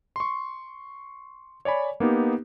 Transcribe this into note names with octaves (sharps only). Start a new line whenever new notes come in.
C6 C#6
C#5 D5 G#5 B5
A#3 B3 D#4 G4